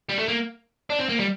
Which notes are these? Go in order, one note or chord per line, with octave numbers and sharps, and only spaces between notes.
G3
A3
A#3
D4
C4
A#3
G3